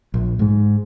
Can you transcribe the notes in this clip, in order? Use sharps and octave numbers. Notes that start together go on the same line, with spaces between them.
A#1
G#2 G#3